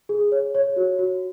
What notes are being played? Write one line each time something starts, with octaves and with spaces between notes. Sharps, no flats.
G#4
C#5
C#5
F#4
F#4